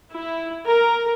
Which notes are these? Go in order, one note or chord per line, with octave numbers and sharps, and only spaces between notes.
E4
A#4